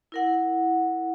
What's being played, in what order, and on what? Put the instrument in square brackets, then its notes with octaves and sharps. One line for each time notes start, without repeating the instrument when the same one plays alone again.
[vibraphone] E4 A#4 F#5